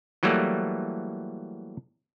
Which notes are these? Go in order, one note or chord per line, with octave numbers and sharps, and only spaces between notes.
E3 F#3 G3 A3 A#3